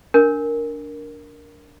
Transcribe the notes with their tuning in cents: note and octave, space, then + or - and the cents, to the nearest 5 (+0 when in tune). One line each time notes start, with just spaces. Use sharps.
D4 -15 A#4 +0